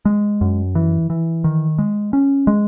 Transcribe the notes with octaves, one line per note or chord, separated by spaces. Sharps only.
G#3
F#2
E3
E3
D#3
G#3
C#4
G#3